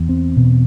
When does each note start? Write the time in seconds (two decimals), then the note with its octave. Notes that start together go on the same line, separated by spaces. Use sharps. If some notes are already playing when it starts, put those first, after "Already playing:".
Already playing: E2
0.09 C4
0.37 B2